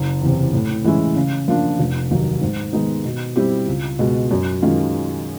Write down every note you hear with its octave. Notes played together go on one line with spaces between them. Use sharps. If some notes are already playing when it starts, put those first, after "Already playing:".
Already playing: F#1
E2 C3
A2
E3 G#3 C#4 E4
C#3
F3 A#3 D4 F4
F1
D#2 D#3 F#3
G#2
D#3 G#3 B3 D#4
B2
G3 C4 E4 G4
C#2
B2 G#3
F#2
D#3 G#3 C#4 F4